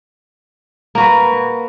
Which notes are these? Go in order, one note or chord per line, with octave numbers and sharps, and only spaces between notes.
A#3 F#4 B4